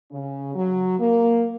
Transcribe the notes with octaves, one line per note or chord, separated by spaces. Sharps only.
C#3
F#3
A#3